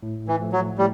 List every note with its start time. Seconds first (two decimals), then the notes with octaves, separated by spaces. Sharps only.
0.03 A2
0.28 E3
0.40 F3 A3
0.53 F#3
0.78 A2 G3